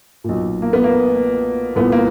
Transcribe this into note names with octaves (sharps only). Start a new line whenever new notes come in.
B1 A#2
A#3
B3
A#3
C2 A#2 B3
A#3